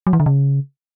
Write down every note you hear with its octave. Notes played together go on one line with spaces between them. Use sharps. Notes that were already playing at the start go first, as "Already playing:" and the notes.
F#3
E3
D3
C#3